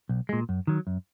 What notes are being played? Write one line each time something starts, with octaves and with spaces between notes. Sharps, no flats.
B1
A#2 G#3
F#2
D#3 F#3
F#2